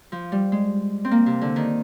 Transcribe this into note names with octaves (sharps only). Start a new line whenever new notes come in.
F3
G3
G#3
C4
A#3
C3
D3
D#3